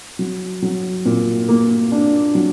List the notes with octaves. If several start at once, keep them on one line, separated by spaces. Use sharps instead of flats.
F#3
F#3
A#2
A#3
D4
F#3